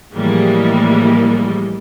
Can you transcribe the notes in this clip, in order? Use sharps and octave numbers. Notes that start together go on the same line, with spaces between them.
A2 E3 F3 G3 G#3 A#3